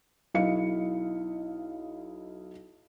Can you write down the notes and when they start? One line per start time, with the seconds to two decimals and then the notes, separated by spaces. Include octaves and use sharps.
0.34 B1 E4 D#5 F5 C#7